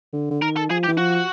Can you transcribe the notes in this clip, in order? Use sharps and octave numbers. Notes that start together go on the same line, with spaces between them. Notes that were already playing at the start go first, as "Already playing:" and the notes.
D3
D3
D#3 A#4
A4
F3 G#4
G4
E3
F3 F#4